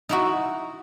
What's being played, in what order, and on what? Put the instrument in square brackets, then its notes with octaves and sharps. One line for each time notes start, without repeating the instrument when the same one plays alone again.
[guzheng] D#4 E4 F#4